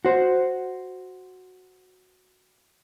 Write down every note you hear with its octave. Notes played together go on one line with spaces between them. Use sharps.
F#4 C5